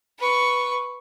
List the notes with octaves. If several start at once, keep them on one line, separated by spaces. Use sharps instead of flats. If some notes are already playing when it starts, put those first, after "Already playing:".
B4 C#6